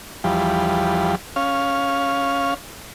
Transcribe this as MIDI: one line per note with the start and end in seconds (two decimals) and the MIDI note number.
0.24 1.15 40
0.24 1.15 53
0.24 1.15 55
1.36 2.54 61
1.36 2.54 77